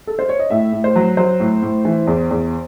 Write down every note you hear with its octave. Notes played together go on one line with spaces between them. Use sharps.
A4
C5
C#5
D#5
A2 E5
A2
C5
F#3
F#3 C5
A2
A2
E3
E2
E2